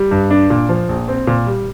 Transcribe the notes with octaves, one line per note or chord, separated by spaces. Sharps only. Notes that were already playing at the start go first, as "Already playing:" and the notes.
Already playing: G3
G2
D4
A#2
F3
A#1
C4
A#2
G3